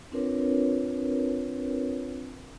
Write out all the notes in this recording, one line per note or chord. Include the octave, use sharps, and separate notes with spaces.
C4 D4 F4 A#4 B4 C#5